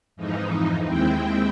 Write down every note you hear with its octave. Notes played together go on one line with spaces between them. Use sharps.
F2 G#2 E3 F3 D#4
D#2 G#3 C4 E4 G5